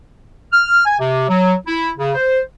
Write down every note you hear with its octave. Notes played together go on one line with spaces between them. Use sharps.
F6
G#5
C3
F#3
E4
C#3
C5